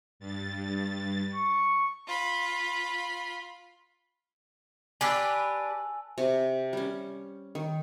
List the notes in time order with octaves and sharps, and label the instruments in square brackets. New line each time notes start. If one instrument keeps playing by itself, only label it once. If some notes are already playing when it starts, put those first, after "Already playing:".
[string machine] G2 A6
[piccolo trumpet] C#6
[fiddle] F4 B5
[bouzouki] D4 G4 B4 [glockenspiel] G#5 E6
[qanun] C3
G3 C#4
D#3